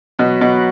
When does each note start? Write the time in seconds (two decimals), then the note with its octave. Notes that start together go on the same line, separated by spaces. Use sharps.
0.19 B2 F#3 B3 F#4
0.41 B2